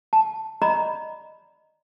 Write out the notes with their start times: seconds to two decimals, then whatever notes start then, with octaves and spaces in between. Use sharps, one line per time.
0.13 A5
0.62 D5 D#5 A#5 B5